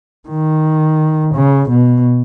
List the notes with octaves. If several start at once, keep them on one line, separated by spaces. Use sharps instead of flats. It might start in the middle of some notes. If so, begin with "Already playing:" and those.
D#3
C#3
B2